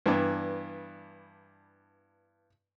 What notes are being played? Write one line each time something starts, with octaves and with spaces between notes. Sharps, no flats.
G2 E3 B3 D4